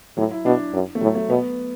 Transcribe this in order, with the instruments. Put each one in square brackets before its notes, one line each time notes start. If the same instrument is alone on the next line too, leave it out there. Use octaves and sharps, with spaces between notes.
[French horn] A2 [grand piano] F#3
[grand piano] E4
[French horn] B2 [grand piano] D4
[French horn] F#2
[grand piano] A3
[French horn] A2 [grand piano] F#3
[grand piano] A3
[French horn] B2 [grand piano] B3